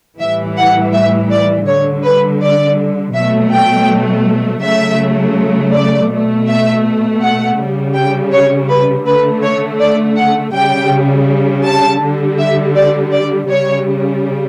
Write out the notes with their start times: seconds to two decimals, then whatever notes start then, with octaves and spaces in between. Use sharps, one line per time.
0.19 A2 E3 G3 E5
0.57 F#5
0.93 E5
1.31 D5
1.67 D3 G3 C#5
2.04 B4
2.42 D5
3.15 B2 F#3 A3 E5
3.52 G5
4.63 C#3 F#3 A3 E5
5.74 D5
6.11 B2 A3
6.48 E5
7.22 F#5
7.59 C#3 G3
7.95 G5
8.32 C#5
8.69 B4
9.06 D3 A3 B4
9.43 C#5
9.80 D5
10.16 F#5
10.53 C#3 G3 G5
11.65 A5
12.01 D3 G3
12.39 E5
12.75 D5
13.12 D5
13.49 C#3 G3 C#5